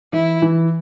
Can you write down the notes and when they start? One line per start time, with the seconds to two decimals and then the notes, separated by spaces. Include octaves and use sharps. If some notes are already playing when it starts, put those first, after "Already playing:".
0.13 E3 E4
0.42 E3